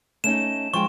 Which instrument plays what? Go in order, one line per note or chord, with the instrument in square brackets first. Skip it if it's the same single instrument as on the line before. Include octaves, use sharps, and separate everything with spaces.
[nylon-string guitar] A3 C#4 D#4 [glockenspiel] E7
[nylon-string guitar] F3 G#3 G5 [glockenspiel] C#6